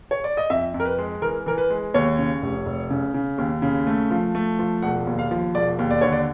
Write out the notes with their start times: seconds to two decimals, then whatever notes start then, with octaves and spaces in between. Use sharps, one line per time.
0.11 C#5
0.24 D5
0.37 D#5
0.50 F2 E5
0.74 F2
0.80 A#4
0.85 B4
0.98 G#3
1.22 E3 A#4
1.46 E3 A#4
1.58 B4
1.70 G#3
1.94 D#2 C#5
2.18 C#3
2.42 F1
2.66 F1
2.90 C#3
3.14 C#3
3.38 D#2
3.62 C#3
3.87 A3
4.11 F3
4.35 A3
4.59 F3
4.82 E1 F#5
5.07 D#2
5.19 F5
5.31 F3
5.55 E1 D5
5.79 D#2
5.91 D5
6.01 D3 C#5
6.13 D5